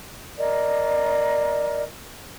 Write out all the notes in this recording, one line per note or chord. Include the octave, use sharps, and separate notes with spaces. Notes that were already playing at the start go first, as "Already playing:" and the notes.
A#4 D5 D#5